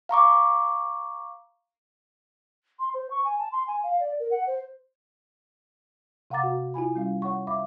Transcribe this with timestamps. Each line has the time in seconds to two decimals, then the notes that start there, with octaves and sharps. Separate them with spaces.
0.09 F5 A#5 C#6 D6
2.79 C6
2.94 C5
3.11 C#6
3.25 G#5
3.38 A5
3.52 C6
3.67 G#5
3.83 F5
4.00 D5
4.19 A#4
4.31 F#5
4.47 C5
6.30 C3 F5 F#5 A#5 D6 A6
6.43 F#4
6.74 E4 F4 G#5 B5
6.95 G3 C#4 F5
7.22 C#5 F#5 C#6
7.47 E5 F5 B5 D6